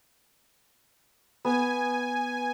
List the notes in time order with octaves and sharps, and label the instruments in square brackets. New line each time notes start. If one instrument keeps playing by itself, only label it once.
[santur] B3 [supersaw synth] G#5